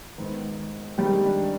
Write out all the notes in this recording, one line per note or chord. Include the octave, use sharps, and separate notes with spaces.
G#2 D#3 B3
G#2 D#3 G3 G#3 C4 G4
D4